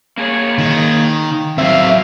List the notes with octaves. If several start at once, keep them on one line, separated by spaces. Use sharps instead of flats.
A#3 G#4 C#5
D#3
E2 F#3 C4 E5 F5